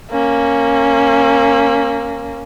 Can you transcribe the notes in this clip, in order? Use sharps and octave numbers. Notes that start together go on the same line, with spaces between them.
A#3 C#4